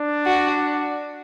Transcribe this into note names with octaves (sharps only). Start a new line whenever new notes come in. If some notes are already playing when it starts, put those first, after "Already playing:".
Already playing: D4
F#4